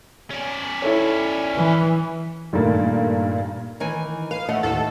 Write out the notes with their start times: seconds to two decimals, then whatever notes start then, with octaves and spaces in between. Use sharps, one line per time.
0.31 C#4 D5
0.82 E4 A4 C#5
1.56 E3
2.53 G2 A#2 D#3 A3 A#3
3.80 D#3 E3 G#5
4.31 B4 F5
4.49 A3 D#5 F#5
4.63 D#2 A2 A4